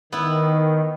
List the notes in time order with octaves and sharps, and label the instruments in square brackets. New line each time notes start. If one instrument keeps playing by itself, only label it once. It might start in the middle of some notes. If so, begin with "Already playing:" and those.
[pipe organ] D#3 [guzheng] B3 E4